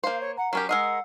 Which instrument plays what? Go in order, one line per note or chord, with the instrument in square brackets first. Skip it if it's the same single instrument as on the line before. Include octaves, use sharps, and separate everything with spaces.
[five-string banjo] A#3 C5 [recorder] F5
[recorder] C#5
[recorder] F#5 [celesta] A#5
[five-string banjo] F#3 C#4 G4 [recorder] A#4
[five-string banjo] G#3 A#4 D#5 [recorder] F#5 [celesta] D#6 E6 C7